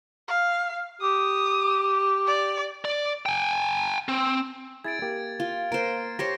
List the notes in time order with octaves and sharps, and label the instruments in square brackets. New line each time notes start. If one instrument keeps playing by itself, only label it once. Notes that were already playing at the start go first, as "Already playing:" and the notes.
[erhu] F5
[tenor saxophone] G4 [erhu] D#6
[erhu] D5
[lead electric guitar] D5
G5 G#5
C4
[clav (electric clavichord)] E4 G#4 [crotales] G#6 A6 D7
[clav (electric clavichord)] A#3 G4 G5
[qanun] F4
[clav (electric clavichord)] A#3 [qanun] A#4 C5 [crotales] D7
[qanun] G4 C5 C#5 [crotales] A#6